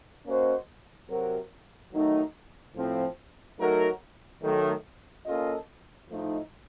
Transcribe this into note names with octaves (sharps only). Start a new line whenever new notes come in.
A#3 C#4 F#4 C5 D#5
C3 F#3 C4 F#4 A#4
D#3 F#3 A3 D#4
A2 F3 C4
F#3 A3 D#4 F#4 A#4
D#3 F#3 A3
A#3 C#4 F4 A4 D#5
A2 F3 A3 D#4